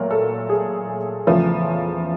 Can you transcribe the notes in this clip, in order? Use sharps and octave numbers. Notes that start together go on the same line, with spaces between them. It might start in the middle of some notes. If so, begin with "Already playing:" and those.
Already playing: A#2 F#3 A3 A#4
A4
G#4
E2 C#3 F3 A3